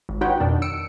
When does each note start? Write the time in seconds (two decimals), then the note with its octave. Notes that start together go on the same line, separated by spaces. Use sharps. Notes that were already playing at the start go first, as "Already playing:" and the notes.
0.09 G#1
0.21 D#4 F4 F#4 B4 C#5 G5
0.40 F2 B2 D#3 D4
0.62 E6 C#7 D7